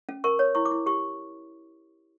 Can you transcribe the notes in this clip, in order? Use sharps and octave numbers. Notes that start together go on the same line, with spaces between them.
C#4
A#4 C#6
C#5
E4 C#6
D6
E4
G4 C#6